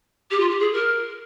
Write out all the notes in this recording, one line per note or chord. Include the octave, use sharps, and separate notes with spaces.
G4
F4
G4
G#4
A#4